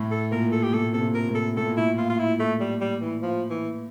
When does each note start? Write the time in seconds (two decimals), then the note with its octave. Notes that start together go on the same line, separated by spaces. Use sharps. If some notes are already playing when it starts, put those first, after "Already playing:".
Already playing: A2
0.11 A4
0.31 A#2 A#4
0.52 A4
0.63 G4
0.73 A2 A4
0.93 C3 A4
1.01 A#2
1.14 A#4
1.29 A2
1.35 A4
1.56 A2 A4
1.66 A#2
1.77 A2 E4
1.98 A#2 F4
2.10 F4
2.19 E4
2.40 A3
2.60 G3
2.81 G3
3.01 E3
3.22 F3
3.50 E3